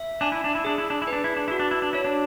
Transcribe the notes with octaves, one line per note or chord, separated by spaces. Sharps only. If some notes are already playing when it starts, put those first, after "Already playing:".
Already playing: E5
D4 G#5
E4
D4
E4
D4 G#4
E4
D4
E4
B4
D4
E4
D4
E4 F#4
D4
E4
D4
E4 C#5
D4